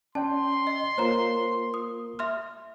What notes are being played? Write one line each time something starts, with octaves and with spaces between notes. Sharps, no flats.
C#4 D5 G5 A5 C6
D#5
A#3 F4 A#4 C5 C#5 A#5
D#6
E5 C6 F6